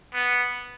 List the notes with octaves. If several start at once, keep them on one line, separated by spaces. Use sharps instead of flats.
B3